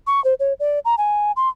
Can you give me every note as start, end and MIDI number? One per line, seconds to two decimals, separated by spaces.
0.07 0.23 85
0.24 0.34 72
0.39 0.53 73
0.60 0.79 74
0.85 0.95 82
0.98 1.32 80
1.36 1.49 84